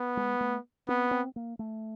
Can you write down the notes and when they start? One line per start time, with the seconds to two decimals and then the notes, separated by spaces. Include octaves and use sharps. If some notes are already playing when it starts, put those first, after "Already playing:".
Already playing: B3
0.17 G#3
0.41 A3
0.88 B3 C4
1.11 C4
1.36 A#3
1.59 A3